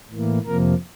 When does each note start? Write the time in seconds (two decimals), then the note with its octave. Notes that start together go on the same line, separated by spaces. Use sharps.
0.11 A2 E3 A#3
0.46 F2 C3 F3 A#3 A#4